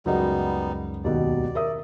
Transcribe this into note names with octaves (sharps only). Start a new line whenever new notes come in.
C#2 F#2 G3 G#3 B3 D#4 F#4
D#2 B2 D5
A#4 E5 D#6